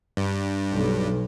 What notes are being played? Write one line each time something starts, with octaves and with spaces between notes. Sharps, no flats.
G2
B1